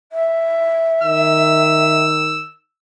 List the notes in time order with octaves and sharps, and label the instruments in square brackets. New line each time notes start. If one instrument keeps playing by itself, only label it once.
[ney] E5
[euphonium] D#3 [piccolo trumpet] E6